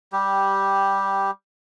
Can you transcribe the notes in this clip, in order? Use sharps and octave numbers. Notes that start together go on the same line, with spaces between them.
G3 G4